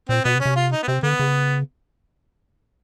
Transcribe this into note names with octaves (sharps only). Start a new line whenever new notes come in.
A#2 C4
B2 B3
C3
C#4
C3
F4
D#4
B3
C3 C4
D3 B3
C#3